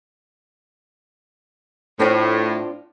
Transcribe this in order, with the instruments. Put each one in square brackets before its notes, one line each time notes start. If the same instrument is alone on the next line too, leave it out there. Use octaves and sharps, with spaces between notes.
[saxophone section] A2 [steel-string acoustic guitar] C4 D4 F4